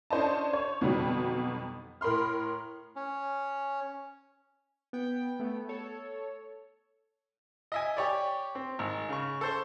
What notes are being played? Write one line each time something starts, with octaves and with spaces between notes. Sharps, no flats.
C#4 D4 C5 D#5 A5
C#5
F2 B2 D3 D#3 F#3 G3
A2 A#4 B5 C6 F6
C#4
B3 G5
A3 B3
A4 C#5
D#5 E5 G#5
G4 C#5 D5
C4
G#1
C#3 C#6
A4 C5 C#6